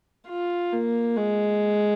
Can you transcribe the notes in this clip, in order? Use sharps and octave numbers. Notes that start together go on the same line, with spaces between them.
F4
A#3
G#3